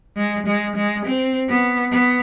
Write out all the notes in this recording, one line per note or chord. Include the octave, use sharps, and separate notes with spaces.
G#3
G#3
G#3
C4
B3
B3